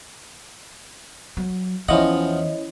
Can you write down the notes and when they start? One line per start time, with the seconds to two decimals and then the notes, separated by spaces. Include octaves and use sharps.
1.37 F#3
1.89 E2 E3 F3 C#4 E4 D#5 F#5